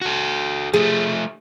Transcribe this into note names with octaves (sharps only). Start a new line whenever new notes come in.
F#4 A4
F3 A3 G#4